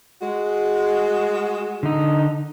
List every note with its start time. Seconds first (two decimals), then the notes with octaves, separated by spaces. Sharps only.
0.21 G#3 F#4
1.83 D3 D#4